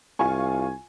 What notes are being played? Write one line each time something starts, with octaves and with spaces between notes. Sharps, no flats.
C2 F4 G#5 C#6